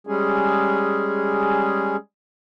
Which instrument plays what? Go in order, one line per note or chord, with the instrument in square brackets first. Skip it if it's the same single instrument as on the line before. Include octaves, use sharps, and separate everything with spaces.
[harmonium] G3 G#3 C#4 G#4